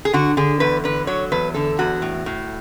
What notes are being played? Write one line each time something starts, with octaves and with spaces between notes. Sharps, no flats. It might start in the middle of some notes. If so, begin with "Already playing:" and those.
G#4
D3 F#4
D3 G#4
E2 B4
D3 B4
F#3 C#5
E2 B4
D3 A4
E2 F#4
A2
A2